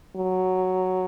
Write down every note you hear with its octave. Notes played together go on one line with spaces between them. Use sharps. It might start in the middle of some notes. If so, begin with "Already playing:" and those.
F#3